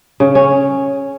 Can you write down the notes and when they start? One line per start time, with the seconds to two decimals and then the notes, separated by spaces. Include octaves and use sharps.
0.20 C#3
0.35 C#4